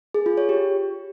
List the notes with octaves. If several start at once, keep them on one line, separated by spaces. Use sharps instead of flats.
G#4
F4
C#5
G4